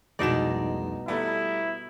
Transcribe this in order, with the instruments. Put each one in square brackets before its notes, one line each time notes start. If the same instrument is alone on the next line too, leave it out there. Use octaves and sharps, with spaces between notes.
[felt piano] F1 C2 [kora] B2 D#4 D5 [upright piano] G#3 E7
[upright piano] G3 A3 B3 [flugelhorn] E4 [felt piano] A#5